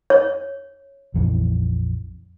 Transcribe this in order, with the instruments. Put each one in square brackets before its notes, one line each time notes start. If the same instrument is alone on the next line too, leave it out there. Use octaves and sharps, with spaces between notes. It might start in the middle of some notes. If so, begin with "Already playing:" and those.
[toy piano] C#5
[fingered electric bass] A#1 F2 E3